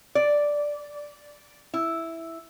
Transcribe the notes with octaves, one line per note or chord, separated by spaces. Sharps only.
D5
E4